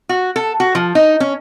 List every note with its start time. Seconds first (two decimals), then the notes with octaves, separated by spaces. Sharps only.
0.09 F#4
0.36 A4
0.60 F#4
0.75 F3
0.95 D#4
1.20 C#4